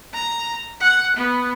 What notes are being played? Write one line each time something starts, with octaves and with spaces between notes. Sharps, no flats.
A#5
F#5
B3